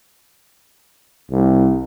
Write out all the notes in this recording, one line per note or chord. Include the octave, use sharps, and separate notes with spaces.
C2